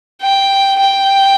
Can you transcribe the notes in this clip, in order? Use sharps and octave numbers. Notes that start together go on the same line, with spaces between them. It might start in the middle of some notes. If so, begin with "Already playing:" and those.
G5
G5